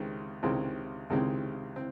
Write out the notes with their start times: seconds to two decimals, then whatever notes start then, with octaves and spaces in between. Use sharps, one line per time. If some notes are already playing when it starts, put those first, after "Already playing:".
Already playing: C#2 C3 D#3 G#3 C4
0.43 C#2 C3 D#3 G#3 C4
1.10 C#2 C3 D#3 G#3 C4
1.76 C4